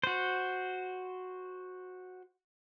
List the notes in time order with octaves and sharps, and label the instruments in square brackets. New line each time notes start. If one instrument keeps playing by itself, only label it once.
[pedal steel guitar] F#4 C5